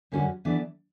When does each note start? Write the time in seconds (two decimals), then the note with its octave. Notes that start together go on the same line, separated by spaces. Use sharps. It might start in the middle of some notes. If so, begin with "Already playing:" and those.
0.12 F#2 D3 G3 C#4 F#4
0.45 E3 B3 D4 A4 D5